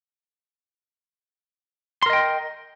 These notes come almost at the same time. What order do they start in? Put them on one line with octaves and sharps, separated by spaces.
C6 A#4 D#5 G5